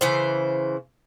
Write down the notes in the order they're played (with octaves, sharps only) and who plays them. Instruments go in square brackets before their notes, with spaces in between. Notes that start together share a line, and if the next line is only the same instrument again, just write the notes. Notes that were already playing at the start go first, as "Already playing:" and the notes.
[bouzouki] C#3 E3 C5